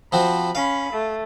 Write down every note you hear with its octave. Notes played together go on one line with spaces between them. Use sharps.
F3 C4 F#4 B5
C#4 F5 B5
A3